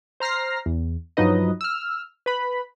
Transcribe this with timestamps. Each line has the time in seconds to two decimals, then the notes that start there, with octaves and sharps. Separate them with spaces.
0.20 C5 A#5 F6 A#6 C7
0.66 E2
1.17 G2 F3 F#3 D#4 B4 D#5
1.61 E6 F6
2.26 B4 B5